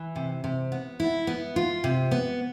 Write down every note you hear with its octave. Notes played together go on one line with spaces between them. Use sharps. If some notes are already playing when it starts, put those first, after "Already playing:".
Already playing: E3
C3
C3
B3
E4
B3
F4
C3
B3